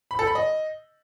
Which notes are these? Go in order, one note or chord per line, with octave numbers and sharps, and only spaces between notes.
B5
A4
B5
D#5